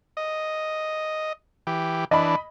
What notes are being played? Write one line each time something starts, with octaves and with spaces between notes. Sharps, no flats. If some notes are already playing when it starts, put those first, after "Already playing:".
D#5
E3 G4
E3 D4 D#5 B5